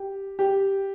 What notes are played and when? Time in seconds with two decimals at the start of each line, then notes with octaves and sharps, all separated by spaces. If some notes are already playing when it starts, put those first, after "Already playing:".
Already playing: G4
0.39 G4